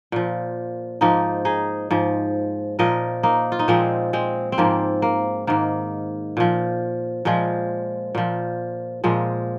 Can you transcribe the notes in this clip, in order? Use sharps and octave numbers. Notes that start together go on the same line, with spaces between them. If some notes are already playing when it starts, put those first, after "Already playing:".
A#2 F3
G#2 F3 A#3 D#4
D#4 G#4
G#2 F3
A#2 F3 A#4 D#5
A#3 D#4
F4
D#4
A#2 F3 G#3 C4
G#3 C4
C4
G#2 F3 A#3
A#3
G#2 D#3 A#3
A#2 F3
A#2 F3 G#3
A#2 F3
A#2 F3 G#3